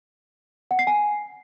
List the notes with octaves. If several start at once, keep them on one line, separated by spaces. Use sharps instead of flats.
F#5
C7
G#5